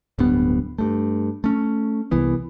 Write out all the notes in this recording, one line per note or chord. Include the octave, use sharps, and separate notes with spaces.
D1 G2 B3
G2 A3
A3 C#4
C2 E3 B3